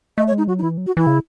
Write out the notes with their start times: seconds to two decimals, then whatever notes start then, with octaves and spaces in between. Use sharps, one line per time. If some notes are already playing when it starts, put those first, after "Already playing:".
0.18 A3 D#5
0.28 C#5
0.32 G#3
0.38 D#4
0.48 F#3 F#4
0.59 D#4
0.62 E3 E4
0.78 F#3
0.86 F#4
0.97 E3 E4
1.07 C#3